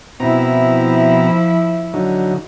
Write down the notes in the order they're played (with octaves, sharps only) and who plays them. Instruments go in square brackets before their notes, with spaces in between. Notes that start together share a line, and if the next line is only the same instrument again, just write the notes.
[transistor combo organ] B2 C4 A#5 [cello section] F3 E4
[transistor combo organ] D3 F#3 D#4